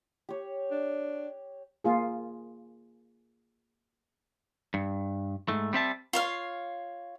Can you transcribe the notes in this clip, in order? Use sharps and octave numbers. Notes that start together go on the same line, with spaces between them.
G4 C#5
D4
A#3 F4 G#4
G2
G#2 A3
G3 C4 E5 A5
F4 C#5 F5